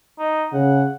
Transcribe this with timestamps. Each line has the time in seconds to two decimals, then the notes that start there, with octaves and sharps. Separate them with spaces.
0.18 D#4
0.53 C#3 F#5